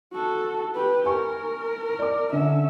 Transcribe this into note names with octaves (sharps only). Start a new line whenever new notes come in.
F#4 A4
G4 B4
A#4 G#5 C#6
D5 D6
D3 C#4 E5